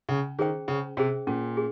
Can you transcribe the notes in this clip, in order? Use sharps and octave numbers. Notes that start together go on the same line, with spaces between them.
C#3 C#4
D#3 G#4 C5 G5
C#3 C#4
C3 G#4 C5 G5
A#2 C#4
G#4